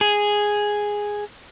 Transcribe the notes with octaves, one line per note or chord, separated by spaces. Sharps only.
G#4